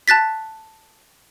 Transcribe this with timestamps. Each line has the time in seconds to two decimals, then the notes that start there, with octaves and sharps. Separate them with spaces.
0.08 A5 F#6 A6 B6